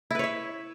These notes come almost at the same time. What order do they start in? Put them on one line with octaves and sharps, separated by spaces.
E4 B4 C#5 E5